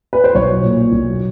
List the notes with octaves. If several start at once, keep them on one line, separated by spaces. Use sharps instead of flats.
B4
C5
B1 C#5
A#2
B1